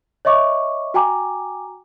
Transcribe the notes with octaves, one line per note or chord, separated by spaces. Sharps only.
C#5 D#5 E5 C#6 D6
F#4 G5 G#5 A#5 D6